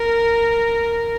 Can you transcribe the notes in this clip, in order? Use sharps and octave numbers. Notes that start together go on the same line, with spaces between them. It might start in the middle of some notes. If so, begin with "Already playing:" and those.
Already playing: A#4